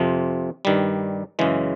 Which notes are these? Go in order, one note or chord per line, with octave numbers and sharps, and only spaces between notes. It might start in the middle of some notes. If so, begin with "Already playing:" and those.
Already playing: F2 C3 F3
G2 D#3 G3
F#2 C#3 E3 G#3